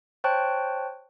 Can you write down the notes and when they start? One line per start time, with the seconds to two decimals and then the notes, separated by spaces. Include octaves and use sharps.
0.24 C5 C#5 G5 A5 C#6 F#6